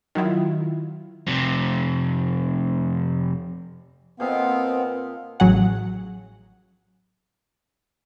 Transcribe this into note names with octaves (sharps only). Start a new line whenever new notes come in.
D#3 F#3 E4 F4
F2 C3
A#2 B3 C4 A4 D#5 F5
A1 F#3 G#4 F#5